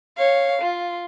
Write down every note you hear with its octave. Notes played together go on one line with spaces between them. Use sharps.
C#5 F5
F4